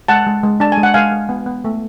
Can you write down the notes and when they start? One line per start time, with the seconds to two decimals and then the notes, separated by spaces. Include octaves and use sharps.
0.08 G#3 F#5 A5
0.26 G#3
0.44 G#3
0.60 D4 A5
0.72 G#5
0.78 G#3
0.83 F#5
0.94 G#3 F5 G#5
1.12 G#3
1.29 B3
1.46 B3
1.64 A3